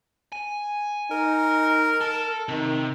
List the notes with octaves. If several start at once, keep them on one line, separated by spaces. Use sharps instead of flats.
G#5
D#4 A#4
A4
C3 D#3